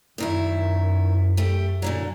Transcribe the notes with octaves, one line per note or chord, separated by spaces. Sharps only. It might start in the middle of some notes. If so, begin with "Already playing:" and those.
F#2 A#2 D#3 E4
A3 G4
A#2 D3 F#3